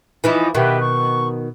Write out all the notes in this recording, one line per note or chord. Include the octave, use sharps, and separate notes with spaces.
E3 F3 D#4 E4
B2 D#3 G4 B4 E5
C#6